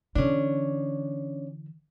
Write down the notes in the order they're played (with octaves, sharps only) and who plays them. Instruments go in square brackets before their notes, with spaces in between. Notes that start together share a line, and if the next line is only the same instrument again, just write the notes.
[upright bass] D3 E3 [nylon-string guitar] C#4 D4